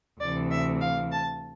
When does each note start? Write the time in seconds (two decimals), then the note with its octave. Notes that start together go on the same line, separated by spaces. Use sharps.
0.21 D2 C3 E3 D5
0.51 E5
0.81 F5
1.12 A5